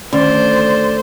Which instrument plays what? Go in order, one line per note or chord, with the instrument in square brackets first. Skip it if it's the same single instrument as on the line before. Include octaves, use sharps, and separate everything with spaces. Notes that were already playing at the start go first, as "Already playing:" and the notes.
[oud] D2 [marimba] D#3 C#4 [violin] C5 [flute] D5